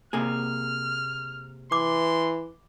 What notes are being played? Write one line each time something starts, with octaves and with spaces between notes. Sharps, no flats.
C3 A#3 G#4 F6
E3 C6 D6